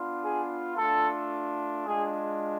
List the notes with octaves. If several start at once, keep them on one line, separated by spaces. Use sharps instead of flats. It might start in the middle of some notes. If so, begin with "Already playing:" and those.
Already playing: B3 D4 F4
G#4
A3 D4 F4 A4
G#3 D4 F4 G#4